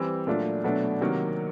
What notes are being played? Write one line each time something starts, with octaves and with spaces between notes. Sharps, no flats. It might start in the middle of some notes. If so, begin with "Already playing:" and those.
Already playing: E3 G3 C4
A#2 F#3 A3 D4 F4
B2 F#3 A3 D4
C3 D#3 F#3 A#3